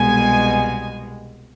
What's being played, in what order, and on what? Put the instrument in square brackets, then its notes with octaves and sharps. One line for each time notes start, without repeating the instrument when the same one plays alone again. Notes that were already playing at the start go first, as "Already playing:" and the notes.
Already playing: [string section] C2 B2 G#3 G#5